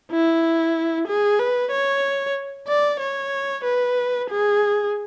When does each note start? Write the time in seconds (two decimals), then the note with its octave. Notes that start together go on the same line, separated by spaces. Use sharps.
0.11 E4
1.08 G#4
1.40 B4
1.72 C#5
2.68 D5
3.00 C#5
3.64 B4
4.29 G#4